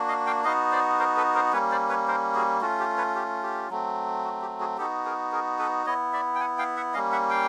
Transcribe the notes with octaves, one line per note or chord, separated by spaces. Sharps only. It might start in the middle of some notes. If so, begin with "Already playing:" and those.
Already playing: A#3 D4 F#4
D#5 F5
F5 G5
B3 D#4 F#4 D#5 F5
C5 D5
A#4 C5
A4 B4
A#4 C5
G3 A#3 C#4 B4 C#5
C5 D5
B4 C#5
A#4 C5
F#4 G#4
A3 C#4 F4 F#4
G4
B4 C#5
G4
G4
F#3 A3 C4
F#4
G4
F#4 G#4
B3 D#4 F#4 G4 A4
G#4 A#4
G#4 A#4
A4 B4
B3 E4 C#5 D#5
D5 E5
G5
F#5 G#5
F5 G5
E5 F#5
G3 A#3 C#4 D#5 F5
E5 F#5
F5 G5